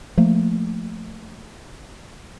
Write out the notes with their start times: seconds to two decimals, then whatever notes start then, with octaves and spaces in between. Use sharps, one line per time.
0.17 F3 A3 A#3